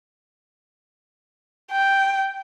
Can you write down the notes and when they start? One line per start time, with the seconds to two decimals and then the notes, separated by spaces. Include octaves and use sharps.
1.71 G5